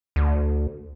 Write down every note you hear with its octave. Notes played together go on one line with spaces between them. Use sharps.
D2